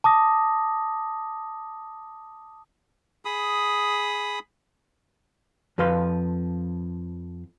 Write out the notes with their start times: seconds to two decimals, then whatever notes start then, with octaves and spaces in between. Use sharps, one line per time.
0.04 A5 D6 D#6 A#6
3.25 G#4 B5 D#6
5.78 F2 F3 B4 F5 C6